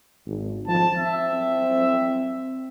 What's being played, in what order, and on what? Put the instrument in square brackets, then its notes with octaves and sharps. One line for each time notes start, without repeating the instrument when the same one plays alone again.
[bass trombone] G#1
[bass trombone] F3 [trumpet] A5
[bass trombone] C4 [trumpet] E5